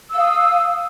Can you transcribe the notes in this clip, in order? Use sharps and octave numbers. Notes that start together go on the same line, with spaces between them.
F5 D#6 E6